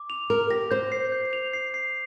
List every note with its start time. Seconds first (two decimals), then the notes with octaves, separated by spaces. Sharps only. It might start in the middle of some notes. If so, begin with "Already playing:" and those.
Already playing: D6
0.10 F7
0.30 A#4 F7
0.50 G4 A#6
0.71 C5 G6
0.92 C7
1.12 G6
1.33 F7
1.53 C7
1.74 C7